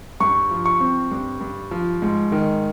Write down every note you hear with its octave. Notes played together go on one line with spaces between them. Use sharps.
G2 C#6
F3
C#6
C4
G2
G2
F3
G#2
D#3